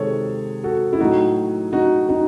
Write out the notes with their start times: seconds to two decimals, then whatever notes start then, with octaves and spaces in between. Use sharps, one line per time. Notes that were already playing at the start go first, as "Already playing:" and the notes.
Already playing: C3 D#3 G#3 G#4 A4 C5 C#5
0.64 F#4 A4
0.93 E4
1.00 A2 F#3 A3 D#4 F#4
1.73 D#4 F#4
2.08 D#4 F#4